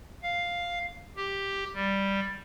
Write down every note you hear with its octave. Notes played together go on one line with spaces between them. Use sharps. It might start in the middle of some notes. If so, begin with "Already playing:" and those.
F5
G4
G3